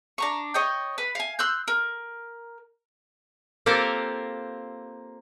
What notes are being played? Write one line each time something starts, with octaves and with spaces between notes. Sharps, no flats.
D4 A#5 C#6
C#5 D#5 G5
B4
F5 G#5
C6 E6 F#6 G6
A#4
A#3 C4 F4 G4 A4 A#4